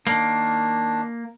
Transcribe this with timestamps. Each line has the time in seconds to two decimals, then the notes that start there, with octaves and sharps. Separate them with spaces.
0.07 D#3 A#3 D4